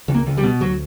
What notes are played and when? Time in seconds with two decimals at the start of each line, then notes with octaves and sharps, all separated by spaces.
0.08 C#2
0.14 A#3
0.26 C#2
0.37 G3
0.43 B2
0.60 D2 F#3